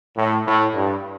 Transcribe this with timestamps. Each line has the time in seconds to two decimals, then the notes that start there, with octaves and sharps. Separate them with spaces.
0.17 A2
0.46 A2
0.74 G2